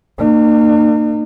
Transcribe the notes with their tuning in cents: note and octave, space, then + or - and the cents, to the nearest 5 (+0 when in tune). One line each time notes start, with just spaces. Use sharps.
A#3 -25 D#4 -45